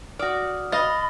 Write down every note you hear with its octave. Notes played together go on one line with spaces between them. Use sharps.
F#4 D5 D#6 F6
D#5 F5 B5 A6 A#6 G7